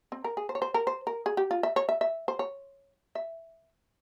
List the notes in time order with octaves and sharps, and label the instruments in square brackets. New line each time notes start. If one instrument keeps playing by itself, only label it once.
[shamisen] C4
A#4
G#4
C5
C#5
C5
A#4
C5
A#4
G#4
G4
F4
E5
C#5
E5
E5
C5
C#5
E5